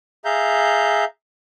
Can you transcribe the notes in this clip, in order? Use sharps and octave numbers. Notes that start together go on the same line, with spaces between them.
G#4 E5 F5 A#5 G6